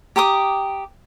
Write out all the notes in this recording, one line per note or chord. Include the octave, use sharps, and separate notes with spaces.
G4 A#5 D6 D#6